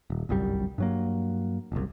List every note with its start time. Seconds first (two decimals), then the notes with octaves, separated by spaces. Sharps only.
0.10 D#1
0.29 G1 C2 F#2 G3
0.78 G2 F#3 A#3
1.72 F#1 C2